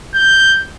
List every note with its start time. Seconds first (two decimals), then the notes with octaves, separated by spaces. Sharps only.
0.15 G6